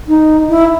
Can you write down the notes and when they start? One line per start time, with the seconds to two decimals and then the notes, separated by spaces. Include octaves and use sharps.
0.08 D#4
0.49 E4